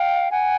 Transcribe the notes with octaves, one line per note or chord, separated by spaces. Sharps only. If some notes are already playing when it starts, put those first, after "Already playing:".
Already playing: F5 G5
F#5 G#5